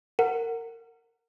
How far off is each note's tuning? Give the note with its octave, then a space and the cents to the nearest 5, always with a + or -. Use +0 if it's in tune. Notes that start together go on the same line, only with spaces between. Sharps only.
A#4 -25 F#5 +0